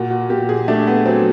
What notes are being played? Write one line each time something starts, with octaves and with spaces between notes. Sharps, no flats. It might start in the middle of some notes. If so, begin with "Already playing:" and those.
Already playing: A#2 F#4
F#4
A#2 G4
G#4
A3 D4
B3
F#3 C4